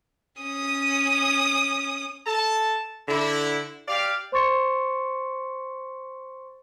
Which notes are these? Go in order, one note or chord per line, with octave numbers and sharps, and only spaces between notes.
C#4 D#6
A4 A5
D3 E4
G4 D5 F5
C5 C6 C#6 A6 C#7